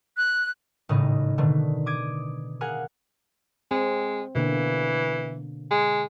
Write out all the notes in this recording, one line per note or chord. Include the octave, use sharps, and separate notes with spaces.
F#6
G#1 A2 C#3 G#3 D#4 D#5
B2 D3 D#3 A3
D6 D#6 G#6 D7 D#7
G#4 A#4 F5 F#5 G#5
G#3 C4
B2 D3 E3 A#3
G#3